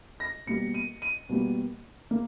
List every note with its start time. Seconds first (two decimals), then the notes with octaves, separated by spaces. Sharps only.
0.20 A#6
0.47 B2 G3 A#3 C#7
0.74 D#7
1.02 D#7
1.29 B2 G3 A#3
2.11 A#3